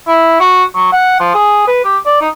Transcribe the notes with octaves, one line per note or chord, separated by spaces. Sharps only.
E4
F#4
F#3
F#5
F3
G#4
B4
G4
D5
D#4